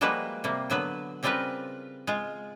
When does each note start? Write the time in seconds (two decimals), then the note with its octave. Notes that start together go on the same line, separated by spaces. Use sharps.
0.01 F3 G3 G#3 A#3 F#4 B4
0.44 C3 G3 A#3
0.70 D3 F#3 B3 B4
1.23 C#3 G3 C4 F4 A#4 B4
2.07 G#3 F4